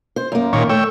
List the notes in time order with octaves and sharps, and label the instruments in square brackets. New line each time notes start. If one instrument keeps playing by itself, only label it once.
[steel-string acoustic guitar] C5
F#2 A#3
[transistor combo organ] A#2 D#3 C#5
[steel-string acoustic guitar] A3 [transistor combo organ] C#5 G5 E6